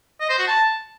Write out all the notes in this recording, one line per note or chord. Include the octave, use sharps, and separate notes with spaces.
D#5
C5
F#4
A5